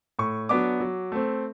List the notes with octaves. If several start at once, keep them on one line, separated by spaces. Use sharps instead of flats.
A2 C#6
F#3 B3 D4 D6
F#3
A3 C4